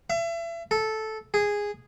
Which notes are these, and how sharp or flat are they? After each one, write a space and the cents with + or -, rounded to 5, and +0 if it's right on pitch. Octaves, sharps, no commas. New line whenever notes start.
E5 +35
A4 -10
G#4 -10